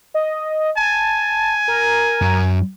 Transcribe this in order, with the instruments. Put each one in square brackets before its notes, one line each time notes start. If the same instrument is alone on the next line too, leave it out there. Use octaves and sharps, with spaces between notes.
[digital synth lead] D#5
[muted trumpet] G#5 [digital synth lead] A5
[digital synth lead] A#4
[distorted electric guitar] F#2